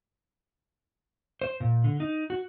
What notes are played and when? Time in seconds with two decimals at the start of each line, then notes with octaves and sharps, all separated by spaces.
1.42 C5
1.60 A#2
1.84 D3
2.00 D#4
2.30 F#4